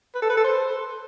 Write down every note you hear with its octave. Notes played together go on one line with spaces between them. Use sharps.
B4
A4
B4
A4
C5